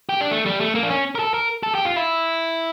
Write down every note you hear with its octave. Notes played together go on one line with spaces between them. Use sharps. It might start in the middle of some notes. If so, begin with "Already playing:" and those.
G4
D4
A3
G3
A3
A#3
D4
C#4
A#4
A4
A#4
A4
G4
F4
E4